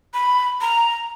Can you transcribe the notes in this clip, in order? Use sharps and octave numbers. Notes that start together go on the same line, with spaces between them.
B5
A#5